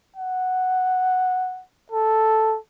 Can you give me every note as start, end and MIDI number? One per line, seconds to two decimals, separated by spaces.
0.16 1.63 78
1.92 2.57 69